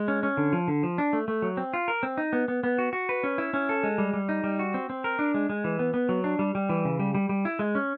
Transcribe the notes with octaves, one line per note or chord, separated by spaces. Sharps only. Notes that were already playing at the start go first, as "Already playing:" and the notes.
Already playing: G#3
C#4
C#4
D3
F3
D3
F3
D4
A3
A3
F#3
C4
F4
A#4
C4
D#4
B3
B3
B3
F#4
F#4
B4
C#4
E4
C#4
A4
G#3
G3
G3
D#4
G3
F#4
C4
C4
A#4
D4
G#3
G#3
E3
B3
B3
F#3
D4
G3
G3
E3
C#3
G3
G3
G3
E4
G#3
C#4